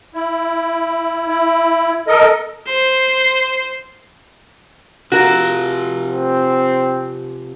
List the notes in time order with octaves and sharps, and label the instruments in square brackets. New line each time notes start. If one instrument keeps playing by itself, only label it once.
[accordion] E4
E4
A4 A#4 D#5
[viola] C5
[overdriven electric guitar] C3 F4 [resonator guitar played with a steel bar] F#4 A#4
[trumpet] C4